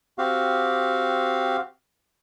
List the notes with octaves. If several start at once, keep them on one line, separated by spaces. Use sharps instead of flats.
C4 F#4 G4 F5